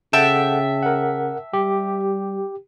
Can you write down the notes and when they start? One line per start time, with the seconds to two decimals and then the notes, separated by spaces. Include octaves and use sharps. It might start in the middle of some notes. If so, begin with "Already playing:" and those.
0.13 C#3 A4 E5 F#5 G5 A5
0.83 A#4 F#5
1.53 G3 G4